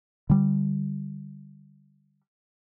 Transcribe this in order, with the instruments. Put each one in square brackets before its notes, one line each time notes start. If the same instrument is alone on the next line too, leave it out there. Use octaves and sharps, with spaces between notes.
[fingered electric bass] D3 G3